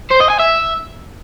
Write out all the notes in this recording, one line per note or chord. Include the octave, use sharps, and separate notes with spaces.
C5
D#5
G#5
E5